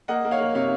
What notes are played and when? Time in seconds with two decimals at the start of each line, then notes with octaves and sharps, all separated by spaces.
0.08 A#3 D#5 F#5
0.25 A#3
0.31 C#5 F5
0.40 A#3
0.55 C3 C#5 F5